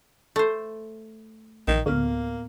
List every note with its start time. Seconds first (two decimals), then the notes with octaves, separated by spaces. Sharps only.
0.36 A3 C5
1.68 A#1 D#3
1.86 D2 A2 A#3 B3 F6